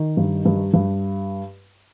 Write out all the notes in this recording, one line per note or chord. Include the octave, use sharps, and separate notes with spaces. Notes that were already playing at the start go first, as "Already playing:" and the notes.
Already playing: D#3
G2
G2
G2